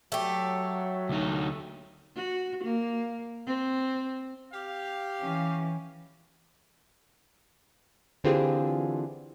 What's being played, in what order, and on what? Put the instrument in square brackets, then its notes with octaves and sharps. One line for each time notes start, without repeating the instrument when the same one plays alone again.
[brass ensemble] F#3 [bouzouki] A3 G4
[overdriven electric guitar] D2 D#4
[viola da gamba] F#4
A#3
C4
[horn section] G4 F5
[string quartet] E3 C#4
[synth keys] D3 E3 C4 F4 G4 G#4